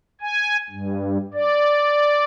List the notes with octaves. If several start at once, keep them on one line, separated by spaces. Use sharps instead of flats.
G#5
G2
D5